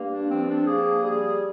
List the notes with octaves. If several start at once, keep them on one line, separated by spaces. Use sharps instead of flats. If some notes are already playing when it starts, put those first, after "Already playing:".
Already playing: G2 A#3
D4
F3 C4
D4
A#3 G#4
G3 G#4